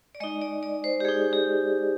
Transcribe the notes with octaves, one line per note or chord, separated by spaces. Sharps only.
D5
G#3 D#4 D#5
D5
D5
C5
G4
G#3 D#4 G#4
G4